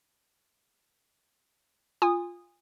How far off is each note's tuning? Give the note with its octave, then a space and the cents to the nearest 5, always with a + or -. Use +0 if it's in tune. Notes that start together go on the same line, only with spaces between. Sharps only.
F4 +0 G#5 -25 D#6 -10